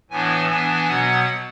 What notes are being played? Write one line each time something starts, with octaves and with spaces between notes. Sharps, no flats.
A2 E3 B3 D4 G#5
E3 B3 D4 G#5
B2 F#3 B3 F#5